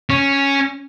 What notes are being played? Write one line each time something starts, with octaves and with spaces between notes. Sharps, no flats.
C#4